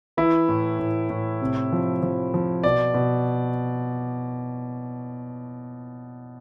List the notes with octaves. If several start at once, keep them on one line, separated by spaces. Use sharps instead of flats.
E3 E4
A2
A2
A2
C3
F3
F3
F3
B2 D5
B2